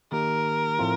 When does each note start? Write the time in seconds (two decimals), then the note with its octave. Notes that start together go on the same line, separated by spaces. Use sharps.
0.12 D#3 A#3 D#4 G4 A#4
0.79 A2 F3 A3 C4 F4